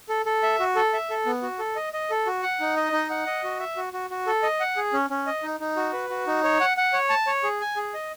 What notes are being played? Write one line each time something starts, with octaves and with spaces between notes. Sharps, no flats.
A4
A4
E5
F#4
A4
E5
A4
B3
F#4
A4
D#5
D#5
A4
F#4
F#5
D#4
D#5
D#4
F#5
D#5
F#4
E5
F#4
F#4
F#4
A4
D#5
F#5
G#4
C#4
C#4
D#5
D#4
D#4
F#4
B4
F#4
D#4
C#5
F#5
F#5
C#5
A5
C#5
G#4
G#5
G#4
D#5